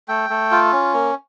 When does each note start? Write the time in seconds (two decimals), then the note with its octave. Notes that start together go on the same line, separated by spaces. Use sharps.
0.08 A3 G5
0.30 A3
0.51 F4
0.72 C#4
0.94 A#3